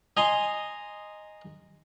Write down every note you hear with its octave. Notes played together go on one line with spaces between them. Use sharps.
D#5 G#5 A#5 C6